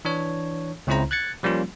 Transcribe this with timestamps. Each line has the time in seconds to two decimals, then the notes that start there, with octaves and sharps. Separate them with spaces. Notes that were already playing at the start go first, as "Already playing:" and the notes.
0.05 E3 D4 C#5
0.87 C#2 C#3 C4 E4 C5 A#5
1.11 F#6 G#6 A6 C#7
1.43 F3 G3 A#3 C#4 F4